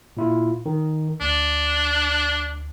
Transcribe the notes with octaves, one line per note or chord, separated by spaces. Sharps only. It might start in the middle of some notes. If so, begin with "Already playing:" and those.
A#2 E4 F4
D#3
D2 D4